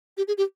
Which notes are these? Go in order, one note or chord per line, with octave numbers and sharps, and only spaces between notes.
G4
G#4
G4